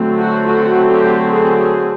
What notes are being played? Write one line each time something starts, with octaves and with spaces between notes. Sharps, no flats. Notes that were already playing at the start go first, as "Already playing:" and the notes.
Already playing: D3 F#3 A3 C4
F#4
F#4
G4
G#4
G#4